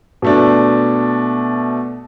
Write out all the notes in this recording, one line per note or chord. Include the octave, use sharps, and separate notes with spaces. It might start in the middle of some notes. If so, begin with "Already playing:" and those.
B2 A3 D4